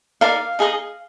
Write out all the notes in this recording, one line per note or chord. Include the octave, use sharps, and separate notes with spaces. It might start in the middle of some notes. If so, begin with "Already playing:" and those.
D#4 A#4 D5 F5
D#4 G#4 B4 D#5